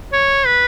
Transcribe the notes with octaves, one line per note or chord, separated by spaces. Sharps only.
C#5
B4